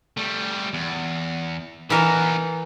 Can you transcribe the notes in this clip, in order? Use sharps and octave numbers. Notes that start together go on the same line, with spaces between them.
G3 A3
E2
E3 B3 D#4 A#4